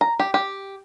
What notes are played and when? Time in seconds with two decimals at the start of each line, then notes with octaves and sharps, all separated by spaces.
0.01 A#5
0.20 G4
0.34 G4